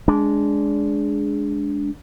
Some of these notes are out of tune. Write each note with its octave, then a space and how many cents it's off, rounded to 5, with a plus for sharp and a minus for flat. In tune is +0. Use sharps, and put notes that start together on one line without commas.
G#3 +0 D4 -15